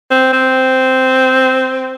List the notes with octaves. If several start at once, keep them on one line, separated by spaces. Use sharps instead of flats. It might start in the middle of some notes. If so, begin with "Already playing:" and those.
C4
C4